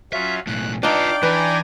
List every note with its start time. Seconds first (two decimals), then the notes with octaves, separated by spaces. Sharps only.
0.13 F#3 C#4 F4 E5
0.47 B1 A2 F#6
0.83 D4 D#4 F4 B4 D5 F5 G5 D6
1.23 E3 D4 B4 G#5 A#5